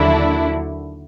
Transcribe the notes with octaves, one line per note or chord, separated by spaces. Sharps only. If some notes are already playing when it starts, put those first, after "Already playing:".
Already playing: D#2 D3 F#3 D4 E4